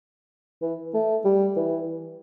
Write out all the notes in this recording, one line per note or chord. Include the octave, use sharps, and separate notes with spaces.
E3
A3
G3
E3